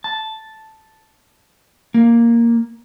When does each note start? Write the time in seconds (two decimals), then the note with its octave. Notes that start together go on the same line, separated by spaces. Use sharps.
0.04 A5
1.94 A#3